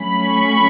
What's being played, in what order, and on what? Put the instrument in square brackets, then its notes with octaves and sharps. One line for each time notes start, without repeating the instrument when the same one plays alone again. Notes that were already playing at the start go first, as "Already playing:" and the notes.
Already playing: [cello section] F#3 A3 C#4 [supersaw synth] B5
[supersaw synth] C#6